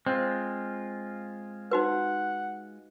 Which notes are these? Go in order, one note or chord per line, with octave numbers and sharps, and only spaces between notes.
G#3 C4 F4
D#4 F#4 B4 F#5